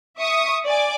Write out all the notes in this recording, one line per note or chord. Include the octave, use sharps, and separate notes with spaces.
E5 C#6 D#6
D5 G#5 D6